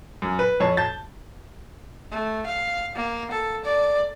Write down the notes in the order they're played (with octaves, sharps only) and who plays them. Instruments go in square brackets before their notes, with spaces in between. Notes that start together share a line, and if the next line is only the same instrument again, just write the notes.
[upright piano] F#2
B4
F2 C#5 A5
A5 G6 A6
[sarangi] A3
F5
A#3
A4
D5